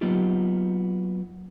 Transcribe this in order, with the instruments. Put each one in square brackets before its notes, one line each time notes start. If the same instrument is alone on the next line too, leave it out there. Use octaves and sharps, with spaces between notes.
[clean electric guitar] F#3 A#3 B3 D#4 F4 G4